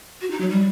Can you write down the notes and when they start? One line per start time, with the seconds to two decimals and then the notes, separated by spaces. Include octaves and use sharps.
0.21 F#4
0.30 D#4
0.40 F#3
0.49 G3